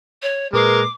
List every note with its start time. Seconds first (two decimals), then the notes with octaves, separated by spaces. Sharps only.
0.22 C#5
0.53 A#2 G#3 A#4 B4 D6 C7